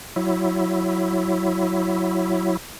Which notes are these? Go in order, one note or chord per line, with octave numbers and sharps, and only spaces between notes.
F#3 E4